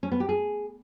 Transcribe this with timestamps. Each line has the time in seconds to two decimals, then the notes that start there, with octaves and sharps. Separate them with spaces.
0.03 C#4
0.12 B3
0.20 G4
0.29 G#4